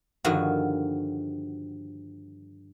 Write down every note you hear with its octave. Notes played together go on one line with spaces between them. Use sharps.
G2 D3 D#3 F3 F#4